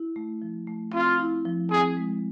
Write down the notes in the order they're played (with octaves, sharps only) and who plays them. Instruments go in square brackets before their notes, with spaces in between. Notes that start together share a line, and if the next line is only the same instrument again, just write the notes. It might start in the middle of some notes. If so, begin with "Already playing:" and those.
Already playing: [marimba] E4
A3
F3
A3
[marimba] C4 [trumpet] F4
[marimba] E4
F3
[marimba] C4 [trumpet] G#4
[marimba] G#3